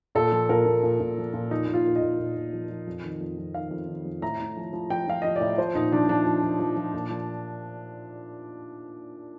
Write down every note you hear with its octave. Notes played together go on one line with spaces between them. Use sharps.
A#2 A4
F3
A#2 A#4
A#2
A#2
A#2
F3
A#2
F3 D#4
A#2
F4
A#2
D#5
A#2
A#2
A#2
F3
F3
F2
D#3
F2
F2
D#3 F5
F2
D#3
F2
A2 A#5
A2
F3
F3
F3 G5
F3 F5
F3 D#5
A2 D5
F3 C5
A#2 D#4
F3 D4
F3 D4
F3
F3
F3
F3
A#2
F3